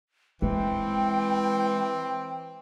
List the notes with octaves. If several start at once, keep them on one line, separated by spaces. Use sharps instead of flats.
E3 G#3 C4 G5